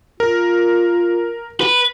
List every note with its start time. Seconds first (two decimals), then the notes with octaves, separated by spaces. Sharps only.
0.20 F4 A#4
1.60 B4